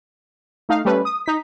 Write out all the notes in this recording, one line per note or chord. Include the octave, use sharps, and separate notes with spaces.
A3 D#4 F5
G3 A3 C#4 B4
D#6
D#4 B6